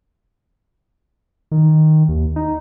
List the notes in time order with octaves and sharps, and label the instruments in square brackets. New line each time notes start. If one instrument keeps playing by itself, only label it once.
[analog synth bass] D#3
D#2
D#4